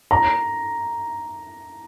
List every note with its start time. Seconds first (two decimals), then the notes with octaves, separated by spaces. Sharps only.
0.11 A#5